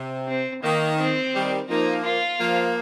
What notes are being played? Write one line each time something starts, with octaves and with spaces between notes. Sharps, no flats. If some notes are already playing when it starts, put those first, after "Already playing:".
Already playing: C3
C4
D#3 A#3
C4
D#3 G3
F3 A#3 D#4
F4
F3 A#3